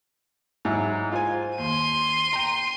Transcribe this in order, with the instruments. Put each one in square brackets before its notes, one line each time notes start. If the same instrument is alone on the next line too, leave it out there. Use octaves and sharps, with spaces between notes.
[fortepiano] G#2 F#3 E4
F4 C5 G#5
[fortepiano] D#2 [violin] C6 D#7
[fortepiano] G5 A#5